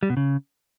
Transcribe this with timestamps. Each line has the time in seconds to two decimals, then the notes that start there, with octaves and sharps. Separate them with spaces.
0.03 G3
0.10 B2
0.17 C#3